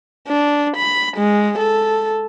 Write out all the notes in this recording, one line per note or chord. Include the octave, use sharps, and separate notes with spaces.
D4
B5
G#3
A4